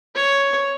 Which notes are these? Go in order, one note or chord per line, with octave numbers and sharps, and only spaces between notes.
C#5